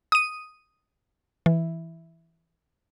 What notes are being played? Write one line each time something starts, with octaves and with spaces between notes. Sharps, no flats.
D#6 D#7
E3